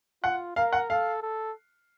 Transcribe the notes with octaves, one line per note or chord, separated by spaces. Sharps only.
F4 F#5
A#4 F5
F#5
A4 F5
A4